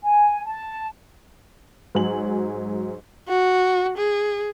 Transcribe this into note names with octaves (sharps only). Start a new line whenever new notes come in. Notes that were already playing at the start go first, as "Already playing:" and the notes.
G#5
A5
G#2 F#3 G#5 F#7
F#4
G#4